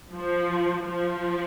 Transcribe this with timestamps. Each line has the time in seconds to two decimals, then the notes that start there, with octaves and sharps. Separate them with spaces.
0.14 F3
0.82 F3